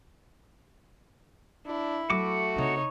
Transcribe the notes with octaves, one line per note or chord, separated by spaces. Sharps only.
D4 E4
F#3 A3 F#4 D6
C#3 C4 D#4 C#5